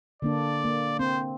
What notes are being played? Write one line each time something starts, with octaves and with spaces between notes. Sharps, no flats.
D3 A#3 D4 D5
A#3
C4 C5